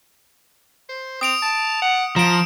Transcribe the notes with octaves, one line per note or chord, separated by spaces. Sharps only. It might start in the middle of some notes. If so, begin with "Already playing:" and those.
C5
C4 D#6 D7 F7
A5
F#5
F3 A#5 D7 E7